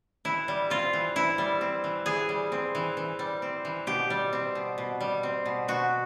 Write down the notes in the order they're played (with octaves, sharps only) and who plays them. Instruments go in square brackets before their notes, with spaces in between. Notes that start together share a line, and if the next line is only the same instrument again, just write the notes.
[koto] E3 E4
G3
C4 F4
E3
E3 E4
G3
C4
E3
E3 G#4
G3
C4
E3
E3
G3
C4
E3
B2 G4
G3
C4
B2
B2
G3
C4
B2
B2 F#4